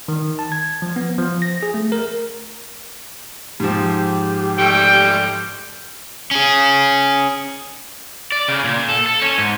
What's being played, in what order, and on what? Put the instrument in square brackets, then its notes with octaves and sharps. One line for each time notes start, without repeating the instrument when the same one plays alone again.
[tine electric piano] D#3
A5
G#6
F3
B3
F3
A#6
G#4
A3
A#4
[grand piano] G#2 F3 [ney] G4
[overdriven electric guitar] G3 A3 [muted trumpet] G5
[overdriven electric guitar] C#4 G#4
[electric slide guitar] D5
C#3
A#2
A4
A4
C#4
G#2